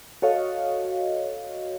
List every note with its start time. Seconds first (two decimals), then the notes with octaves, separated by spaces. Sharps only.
0.22 F#4 A4 C#5 D#5 F5